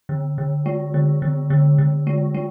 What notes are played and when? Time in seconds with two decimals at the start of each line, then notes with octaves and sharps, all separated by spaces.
0.09 D3
0.38 D3
0.66 G#3
0.94 D3
1.22 D3
1.50 D3
1.78 D3
2.07 G#3
2.34 G#3